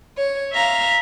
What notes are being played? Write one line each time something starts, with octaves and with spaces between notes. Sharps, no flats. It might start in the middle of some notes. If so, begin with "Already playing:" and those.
C#5
E5 F5 A#5